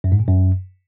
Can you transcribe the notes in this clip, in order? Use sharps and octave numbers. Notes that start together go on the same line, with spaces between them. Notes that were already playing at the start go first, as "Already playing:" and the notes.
F#2
G#2
A#2
F#2